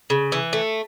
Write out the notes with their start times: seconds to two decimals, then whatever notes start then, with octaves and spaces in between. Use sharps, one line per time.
0.10 C#3
0.32 E3
0.53 A3